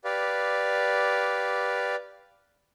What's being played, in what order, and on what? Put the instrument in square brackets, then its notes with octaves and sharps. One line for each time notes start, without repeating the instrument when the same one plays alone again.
[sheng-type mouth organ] G4 B4 D5 F5